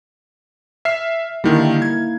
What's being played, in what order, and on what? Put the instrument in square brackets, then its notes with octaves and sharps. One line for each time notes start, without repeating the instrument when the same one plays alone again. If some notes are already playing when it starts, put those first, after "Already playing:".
[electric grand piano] E5 F6 C7
[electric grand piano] D3 D#3 G3 [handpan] A#3 D#4 E4
[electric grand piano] G#6